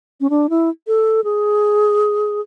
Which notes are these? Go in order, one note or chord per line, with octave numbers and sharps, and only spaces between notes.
C#4
D4
E4
A4
G#4